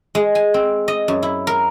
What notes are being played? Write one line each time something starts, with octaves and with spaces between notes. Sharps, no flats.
G#3
G#5
C4
D#5
F#2
E4
A#4